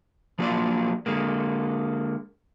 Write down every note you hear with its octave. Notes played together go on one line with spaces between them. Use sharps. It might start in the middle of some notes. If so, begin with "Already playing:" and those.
F3 F#3 A#3 D4 F4 D5
D3 G#3 A#3